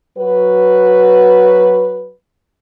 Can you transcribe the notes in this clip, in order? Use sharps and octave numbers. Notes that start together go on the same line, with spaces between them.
F#3 F#4 B4